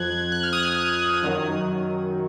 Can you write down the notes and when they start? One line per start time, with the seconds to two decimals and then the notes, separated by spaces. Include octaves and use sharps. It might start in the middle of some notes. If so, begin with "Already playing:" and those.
Already playing: F2 F3 F#6 G#6
0.32 F#6
0.43 F6
0.53 D#6
0.63 F6
0.78 F#6
1.23 F#2 D#3 F#3